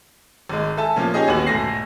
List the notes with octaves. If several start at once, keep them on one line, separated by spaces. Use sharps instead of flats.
G#1 G#3
A4 E5 G#5 A5
A#2 F3 A#3 C#4
C#4 D#4 G4 G#4 D#5
A1 D#2 B3 F#4 F#7
E1 G#2 A3 G#5 A#6 C7